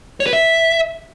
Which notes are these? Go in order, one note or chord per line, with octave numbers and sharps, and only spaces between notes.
C#5
B4
E5